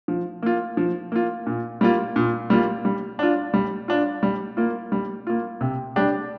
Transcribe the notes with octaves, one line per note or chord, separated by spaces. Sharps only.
F3
A#3 F4
F3
A#3 F4
A#2
G3 A#3 F4
A#2
G3 A#3 F4
G3
D4 F4
G3
D4 F4
G3
A#3 F4
G3
A#3 F4
C3
G3 D4 G4